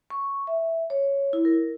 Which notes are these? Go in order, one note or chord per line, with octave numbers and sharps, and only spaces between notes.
C#6
E5
C#5
E4
A#4